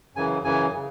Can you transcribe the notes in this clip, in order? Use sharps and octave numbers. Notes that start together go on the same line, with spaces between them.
F#2 C#3 E3 G#5
F#2 C#3 E3 G#5
C#3